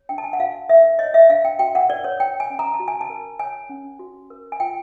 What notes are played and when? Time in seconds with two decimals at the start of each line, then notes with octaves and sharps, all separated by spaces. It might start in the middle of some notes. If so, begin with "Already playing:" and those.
Already playing: C#5
0.09 D4 G5
0.18 A5
0.24 G#5
0.33 F#5
0.40 F#4 F5
0.69 A#4 E5
0.99 C#5 D#5
1.14 E5
1.30 D4 F5
1.45 G5
1.59 F#4 G5
1.75 F#5
1.89 A#4 D5
2.04 C#5
2.19 C#5 G5
2.40 G#5
2.50 C#4
2.59 A#5
2.74 A5
2.80 F#4
2.88 G#5
3.01 A5
3.10 A#4
3.39 C#5 G#5
3.69 C#4
3.99 F#4
4.30 A#4
4.52 G#5
4.60 F4 G5